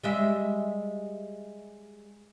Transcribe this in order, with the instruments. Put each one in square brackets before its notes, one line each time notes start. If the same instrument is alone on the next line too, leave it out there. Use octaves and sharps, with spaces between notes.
[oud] G3 G#3 E5